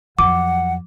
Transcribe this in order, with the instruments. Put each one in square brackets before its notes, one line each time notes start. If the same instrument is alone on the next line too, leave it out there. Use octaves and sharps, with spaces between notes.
[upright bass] F2 F#3 [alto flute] F#5 [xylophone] D6